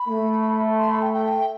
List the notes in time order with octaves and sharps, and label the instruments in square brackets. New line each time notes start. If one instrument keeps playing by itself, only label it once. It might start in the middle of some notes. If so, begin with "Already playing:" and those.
Already playing: [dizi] B5
[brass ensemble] A3
[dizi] C6
B5
G5
G5